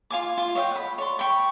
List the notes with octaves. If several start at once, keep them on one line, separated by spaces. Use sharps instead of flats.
F4 F5 G#5 D6
F4
C#5 D#5 E5 G5
F#5 B5
C#5 D5 C6
G5 B5 C#6